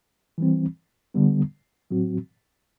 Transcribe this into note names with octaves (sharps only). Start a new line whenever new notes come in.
E3 G3 C4
D3 G3 B3
A2 F#3 C4 F#4